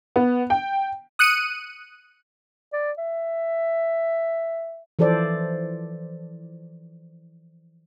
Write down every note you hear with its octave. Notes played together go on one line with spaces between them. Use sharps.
B3
G5
D#6 F#6 C#7 D#7
D5
E5
E3 F3 A4 C5 D5